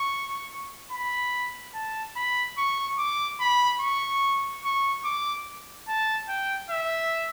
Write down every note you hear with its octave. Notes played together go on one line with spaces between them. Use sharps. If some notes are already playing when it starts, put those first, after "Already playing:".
Already playing: C#6
B5
A5
B5
C#6
D6
B5
C#6
C#6
D6
A5
G5
E5